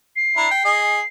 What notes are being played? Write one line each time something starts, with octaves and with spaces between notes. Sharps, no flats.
C7
D4 E4 A#5
G5
G#4 D#5